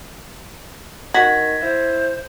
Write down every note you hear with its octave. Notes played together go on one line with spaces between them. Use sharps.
D#3 F#4 G#6 A#6 B6
E4 C5